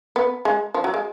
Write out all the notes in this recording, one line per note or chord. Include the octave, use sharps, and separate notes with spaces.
B3
G#3
F3
F#3
G#3